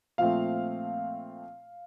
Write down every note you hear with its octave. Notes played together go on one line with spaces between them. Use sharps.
A#2 F3 A3 C4 F5